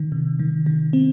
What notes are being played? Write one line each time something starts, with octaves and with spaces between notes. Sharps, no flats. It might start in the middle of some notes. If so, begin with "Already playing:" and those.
Already playing: D#3
C3
D#3
D#3
C4